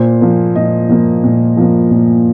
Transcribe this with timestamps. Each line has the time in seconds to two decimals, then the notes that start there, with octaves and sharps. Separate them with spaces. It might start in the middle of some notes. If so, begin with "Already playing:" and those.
Already playing: A#2 C5
0.21 F3 A#3
0.56 A#2 D#5
0.89 F3 A#3
1.24 A#2
1.57 F3 A#3
1.91 A#2